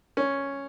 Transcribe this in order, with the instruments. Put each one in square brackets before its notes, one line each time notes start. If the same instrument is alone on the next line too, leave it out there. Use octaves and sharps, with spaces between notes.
[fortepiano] C#4